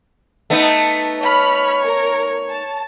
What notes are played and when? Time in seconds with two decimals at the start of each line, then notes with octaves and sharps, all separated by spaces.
0.50 A3 B3 D#4
1.22 C#5 B5 F6
1.84 A#4
2.50 A5